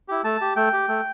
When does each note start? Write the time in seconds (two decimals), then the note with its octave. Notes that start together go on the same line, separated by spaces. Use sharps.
0.08 E4 G4
0.24 A3 A5
0.41 G4
0.56 A3 G5
0.73 G4
0.88 A3